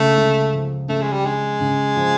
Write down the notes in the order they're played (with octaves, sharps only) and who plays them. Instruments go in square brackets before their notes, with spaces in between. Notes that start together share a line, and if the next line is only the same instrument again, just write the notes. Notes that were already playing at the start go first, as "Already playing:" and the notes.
Already playing: [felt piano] C#2 C#3 [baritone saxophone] A3
[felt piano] C#2
F3
[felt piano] C#3 [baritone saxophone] A3
[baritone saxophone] G#3
G3
[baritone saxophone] G#3 [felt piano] D4
[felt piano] C#3
F3